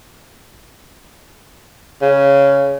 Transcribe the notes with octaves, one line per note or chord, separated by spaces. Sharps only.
C#3